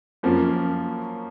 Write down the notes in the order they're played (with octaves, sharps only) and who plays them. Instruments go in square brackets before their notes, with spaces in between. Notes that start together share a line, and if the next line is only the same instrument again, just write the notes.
[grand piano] F#2 F3 A#3 C#4